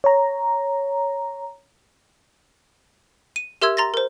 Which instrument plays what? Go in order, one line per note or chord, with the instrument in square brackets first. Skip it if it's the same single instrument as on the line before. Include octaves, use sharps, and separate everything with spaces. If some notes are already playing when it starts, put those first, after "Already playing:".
[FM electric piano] C#5 A#5
[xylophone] D#7
G4 A#4 E5 C6 E6 G#6
A#5 C6 A6 A#6
A#4 C5